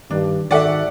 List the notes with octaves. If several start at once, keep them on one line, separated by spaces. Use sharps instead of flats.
G2 D#3 D4
G#2 D#3 F#4 A4 D5 E5 F#5